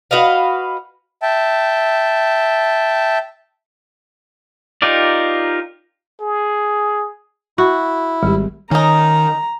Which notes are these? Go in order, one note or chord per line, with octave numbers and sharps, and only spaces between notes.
F#4 B4 D#5 F5
E5 G5 A5
D#4 F4 G4 A#4 D5
G#4
E4 F#4
G#1 G3 G4
D#3 C#4 D#4 A#5